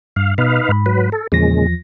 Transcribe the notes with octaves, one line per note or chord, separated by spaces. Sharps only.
G2 F5
B2 D#4 B4 F5
G#2 B5
F#3 B4
A4
E2 A#2 C#3 F3 G#3 A#6